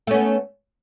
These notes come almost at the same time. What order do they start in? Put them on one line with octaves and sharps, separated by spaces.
A3 C#4 B3